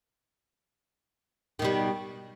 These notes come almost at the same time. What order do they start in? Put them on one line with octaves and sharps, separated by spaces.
D#3 B2 G3